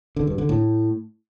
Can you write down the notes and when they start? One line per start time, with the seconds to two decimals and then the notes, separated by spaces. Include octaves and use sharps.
0.16 D3
0.27 G2
0.38 D3
0.49 A2